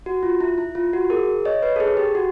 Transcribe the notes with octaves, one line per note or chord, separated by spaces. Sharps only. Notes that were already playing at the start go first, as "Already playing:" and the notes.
F#4
F4
E4
E4
F4
F#4
G#4 A#4
C#5 D#5
B4 C#5
A4
G#4
G4
F#4